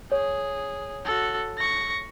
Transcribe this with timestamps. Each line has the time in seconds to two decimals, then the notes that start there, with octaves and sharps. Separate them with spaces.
0.12 G#4 C#5
1.05 F#4 A4
1.58 C#6 A#6